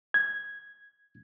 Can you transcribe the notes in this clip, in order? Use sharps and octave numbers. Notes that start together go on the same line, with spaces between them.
G#6